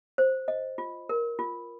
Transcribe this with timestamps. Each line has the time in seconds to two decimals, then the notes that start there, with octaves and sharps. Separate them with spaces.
0.18 C5
0.48 D#5
0.78 F4
1.09 A#4
1.39 F4